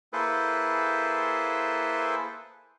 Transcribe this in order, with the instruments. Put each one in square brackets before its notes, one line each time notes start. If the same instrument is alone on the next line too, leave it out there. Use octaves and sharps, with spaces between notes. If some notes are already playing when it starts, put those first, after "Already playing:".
[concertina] A#3 E4 G#4 A4 B4 C5